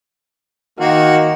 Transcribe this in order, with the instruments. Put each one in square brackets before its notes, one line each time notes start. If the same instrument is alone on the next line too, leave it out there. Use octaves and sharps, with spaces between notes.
[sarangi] D#3 [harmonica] A#3 F#4